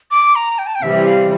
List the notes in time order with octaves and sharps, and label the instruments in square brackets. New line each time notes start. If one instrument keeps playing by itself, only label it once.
[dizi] D6
A#5
G5
A5
G5
[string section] C3 E3 G3 [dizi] E5
[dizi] F5